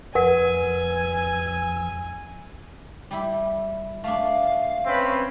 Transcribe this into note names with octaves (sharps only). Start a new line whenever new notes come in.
F2 F3 A#4 B4 F#5 G#5 E6
G3 E4 G4
A3 D4 F5
C4 C#4 B4